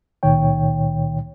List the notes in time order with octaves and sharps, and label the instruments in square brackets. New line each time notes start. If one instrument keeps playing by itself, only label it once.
[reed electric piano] C#2 A#2 D#3 C#5 G5